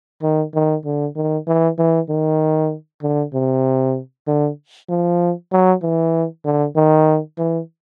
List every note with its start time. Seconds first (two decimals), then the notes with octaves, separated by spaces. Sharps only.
0.22 D#3
0.54 D#3
0.85 D3
1.16 D#3
1.47 E3
1.78 E3
2.09 D#3
3.02 D3
3.34 C3
4.27 D3
4.89 F3
5.52 F#3
5.82 E3
6.45 D3
6.76 D#3
7.38 E3